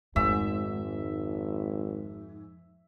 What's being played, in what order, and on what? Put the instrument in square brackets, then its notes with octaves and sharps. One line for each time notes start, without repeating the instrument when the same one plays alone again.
[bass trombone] G#1 [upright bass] F2 [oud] G#2 [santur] E5